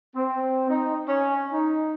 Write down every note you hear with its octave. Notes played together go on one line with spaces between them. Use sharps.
C4
D#4
C#4
D#4